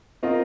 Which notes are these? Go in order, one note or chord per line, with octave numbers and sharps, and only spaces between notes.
C4 F4 A#4 D#5